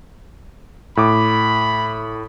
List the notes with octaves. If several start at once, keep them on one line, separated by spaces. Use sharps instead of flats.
A2 B5 D6